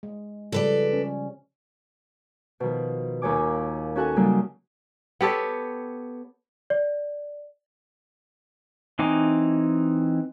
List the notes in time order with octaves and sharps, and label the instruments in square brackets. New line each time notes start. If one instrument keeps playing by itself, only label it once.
[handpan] G#3
[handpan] C#3 F3 G3 [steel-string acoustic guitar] A4 B4 D5
[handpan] C#4
[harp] B2 D#3 F3
D#2 A#2 C#5 G#5 D6
C#4 F#4 A4 F#5 G#5
C#3 F#3 G3 A#3 D#4
[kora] B3 G4 A4 C#5
[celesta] D5
[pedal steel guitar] E3 C4 D#4 G#5 D6